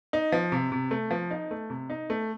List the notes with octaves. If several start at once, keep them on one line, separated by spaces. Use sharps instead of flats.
D#4
F3
C3
C3
A3
F3
D#4
A3
C3
D#4
A3